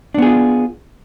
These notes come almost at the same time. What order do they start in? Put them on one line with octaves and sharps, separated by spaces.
D4 B3 G#4 F4